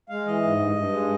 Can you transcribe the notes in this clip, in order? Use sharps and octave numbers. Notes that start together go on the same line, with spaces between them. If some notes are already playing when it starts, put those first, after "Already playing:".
G#3 F5
E3 D#5
G#2
G2
G2
G#3